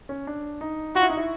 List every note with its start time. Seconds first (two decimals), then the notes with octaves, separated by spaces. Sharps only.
0.09 C#4
0.27 D4
0.61 D#4
0.95 F4 F#4
1.03 E4
1.10 D#4
1.17 E4